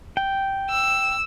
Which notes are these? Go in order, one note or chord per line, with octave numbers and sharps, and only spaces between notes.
G5
E6